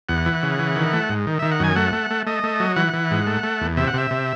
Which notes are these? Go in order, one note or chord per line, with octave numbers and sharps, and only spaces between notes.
E2 F#5
E3
C#3
E3
D#3
A3
G#2
D#3
D#3 E5
F#5
F#2 G#5
A3 F#5
A3
A3
A3 D#5
A3
F#3
E3 F#5
E3
G#2
A3
A3
E2
C3 E5
F#5
C3 E5
C3